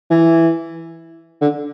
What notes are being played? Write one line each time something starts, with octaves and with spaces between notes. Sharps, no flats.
E3
D3